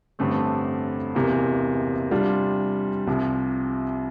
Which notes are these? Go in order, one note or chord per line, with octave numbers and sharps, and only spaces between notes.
A1 G2 D3 A3 C4
E1 E2 C3 E3 A#3
C3 G3 D4 F4
C2 C3 F3